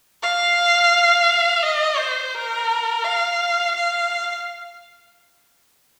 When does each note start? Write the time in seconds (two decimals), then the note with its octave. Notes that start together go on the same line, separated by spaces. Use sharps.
0.23 F5
1.63 D#5
1.98 C5
2.34 A#4
3.04 F5
3.75 F5